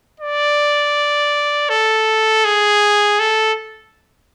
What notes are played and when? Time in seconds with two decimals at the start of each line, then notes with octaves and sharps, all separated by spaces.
0.20 D5
1.70 A4
2.45 G#4
3.19 A4